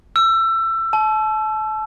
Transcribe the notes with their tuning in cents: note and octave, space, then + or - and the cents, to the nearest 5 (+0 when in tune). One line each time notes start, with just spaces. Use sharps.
E6 +25
A5 -30